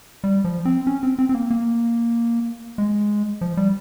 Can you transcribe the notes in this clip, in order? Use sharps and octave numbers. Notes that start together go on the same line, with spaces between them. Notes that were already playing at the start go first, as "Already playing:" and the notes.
G3
F3
C4
C#4
C4
C4
C4
A#3
A#3
G#3
F3
G3